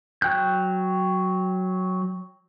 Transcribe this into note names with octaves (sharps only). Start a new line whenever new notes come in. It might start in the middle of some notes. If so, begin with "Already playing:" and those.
F#3 G5 F#6 G6